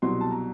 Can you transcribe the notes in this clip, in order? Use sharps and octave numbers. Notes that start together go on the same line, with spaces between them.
C2 B2 F#3 C6
A5
A#5